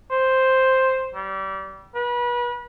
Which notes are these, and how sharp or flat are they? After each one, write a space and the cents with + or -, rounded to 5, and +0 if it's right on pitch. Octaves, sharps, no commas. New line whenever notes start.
C5 +0
G3 -25
B4 -30